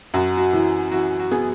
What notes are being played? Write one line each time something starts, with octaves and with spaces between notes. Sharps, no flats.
F#2 F#4
F#4
E3
E3 F#4
F#4
B3 G#4